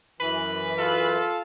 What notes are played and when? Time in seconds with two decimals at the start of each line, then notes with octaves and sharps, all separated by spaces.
0.20 F#2 E3 B4
0.78 F4 A4 F5